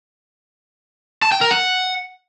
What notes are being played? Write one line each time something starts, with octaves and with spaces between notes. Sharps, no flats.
A5
G5
A#4
F#5